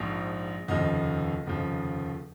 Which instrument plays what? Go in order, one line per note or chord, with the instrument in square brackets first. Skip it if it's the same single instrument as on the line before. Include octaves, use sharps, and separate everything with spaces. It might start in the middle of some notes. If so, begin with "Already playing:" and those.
Already playing: [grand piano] A#1 G#2 F3
F1 D#2 C#3 F3 D#5
F1 D#2 C#3 F3